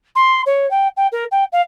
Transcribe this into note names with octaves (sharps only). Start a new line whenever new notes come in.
C6
C#5
G5
G5
A#4
G5
F5